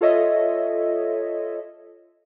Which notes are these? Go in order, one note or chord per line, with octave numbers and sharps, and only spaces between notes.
F4 A4 C#5 D#5 E5